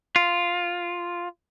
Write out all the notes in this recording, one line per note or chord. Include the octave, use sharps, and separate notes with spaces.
F4